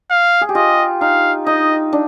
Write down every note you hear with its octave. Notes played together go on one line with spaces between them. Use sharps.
F5
G#4
G4
F4 D#5
D#4 F5
D#4 D#5
D4